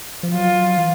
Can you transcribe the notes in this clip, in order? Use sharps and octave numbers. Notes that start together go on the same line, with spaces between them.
F3
F#3 F4
E3